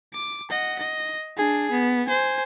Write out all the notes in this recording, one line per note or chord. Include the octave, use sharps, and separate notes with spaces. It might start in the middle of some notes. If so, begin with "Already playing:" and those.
D6
D#5 F#5
D#5
D4 G#4
B3
C5 G#5